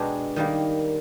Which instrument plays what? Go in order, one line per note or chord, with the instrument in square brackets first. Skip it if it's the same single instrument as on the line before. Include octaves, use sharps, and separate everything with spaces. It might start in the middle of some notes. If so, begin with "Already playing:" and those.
Already playing: [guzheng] B2 G#3 B3 D4 G4
D#3 G3 A#3